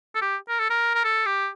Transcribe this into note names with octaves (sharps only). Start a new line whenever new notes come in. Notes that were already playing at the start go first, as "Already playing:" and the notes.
A4
G4
A#4
A4
A#4
A#4
A4
G4